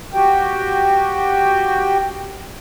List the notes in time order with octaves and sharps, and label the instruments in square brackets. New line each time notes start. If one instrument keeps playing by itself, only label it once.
[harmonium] F#4 G4 G5